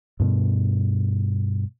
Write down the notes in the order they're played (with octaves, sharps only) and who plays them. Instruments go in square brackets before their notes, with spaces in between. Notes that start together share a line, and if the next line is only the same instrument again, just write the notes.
[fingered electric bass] G2 B2